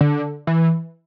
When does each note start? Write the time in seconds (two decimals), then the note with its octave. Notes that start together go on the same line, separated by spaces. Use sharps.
0.01 D3
0.47 E3